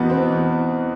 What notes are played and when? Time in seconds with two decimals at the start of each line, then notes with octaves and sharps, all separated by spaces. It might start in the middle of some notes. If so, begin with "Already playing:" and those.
Already playing: E2 B2 B3 D#4
0.10 C4
0.30 E2